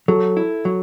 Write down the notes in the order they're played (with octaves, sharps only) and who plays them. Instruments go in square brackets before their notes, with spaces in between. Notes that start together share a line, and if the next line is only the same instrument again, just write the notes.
[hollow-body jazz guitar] F#3 [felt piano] A4
[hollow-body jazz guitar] E4
F#3